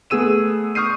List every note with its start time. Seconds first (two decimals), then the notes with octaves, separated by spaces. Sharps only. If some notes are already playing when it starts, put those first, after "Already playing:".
0.10 A3 B3 G#4 E6 D#7 E7
0.75 C#6 D#6 F6 G6 C7 D#7